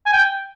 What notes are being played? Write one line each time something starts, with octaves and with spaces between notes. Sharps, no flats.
G#5
G5